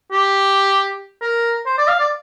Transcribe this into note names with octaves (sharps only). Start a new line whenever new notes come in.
G4
A#4
C5
D5
F5
D5